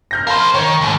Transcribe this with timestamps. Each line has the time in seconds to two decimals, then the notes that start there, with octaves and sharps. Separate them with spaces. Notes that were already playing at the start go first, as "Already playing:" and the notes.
0.11 F6 G6 A#6
0.27 A#4 C5 F5 A5 B5
0.54 D#3 C#5
0.81 D#2 G#2